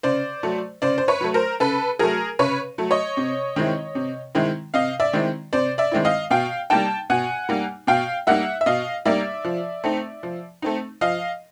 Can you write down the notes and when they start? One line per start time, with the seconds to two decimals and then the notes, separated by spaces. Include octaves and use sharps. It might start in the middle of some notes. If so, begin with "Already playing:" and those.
0.03 C#3 C5 D5
0.43 F#3 A3
0.82 C#3 C5 D5
0.98 C5
1.08 B4 C#5
1.21 F#3 A3
1.34 A#4 C5
1.60 C#3 A4 B4
1.99 F#3 A3 G#4 A#4
2.39 C#3 B4 C#5
2.78 F#3 A3
2.91 C#5 D#5
3.17 C3
3.56 D#3 G#3 C4 E4
3.95 C3
4.35 D#3 G#3 C4 E4
4.74 C3 D#5 F5
5.00 D5 E5
5.13 D#3 G#3 C4 E4
5.53 C3 C5 D5
5.78 D5 E5
5.92 D#3 G#3 C4 E4
6.05 D#5 F5
6.30 B2 F5 G5
6.70 G3 A#3 D#4 G5 A5
7.10 B2 F#5 G#5
7.49 G3 A#3 D#4
7.87 B2 F5 G5
8.27 G3 A#3 D#4 E5 F#5
8.61 E5
8.66 B2 D#5 F5
9.05 G3 A#3 D#4 D5 E5
9.44 F3
9.84 A3 C4 D#4
10.23 F3
10.62 A3 C4 D#4
11.01 F3 D#5 F5